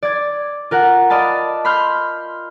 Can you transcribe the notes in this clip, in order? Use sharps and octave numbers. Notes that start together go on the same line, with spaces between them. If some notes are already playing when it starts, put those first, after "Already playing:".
D5 G#6
F4 A#4 F#5
D5 D#5 F5 A5 B5
B5 C6 F6 G6